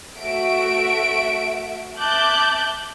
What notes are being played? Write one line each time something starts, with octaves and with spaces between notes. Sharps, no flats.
A3 F#4 E5 D7
E5 A5 D6 F#6 G6